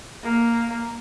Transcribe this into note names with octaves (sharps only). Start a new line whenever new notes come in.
A#3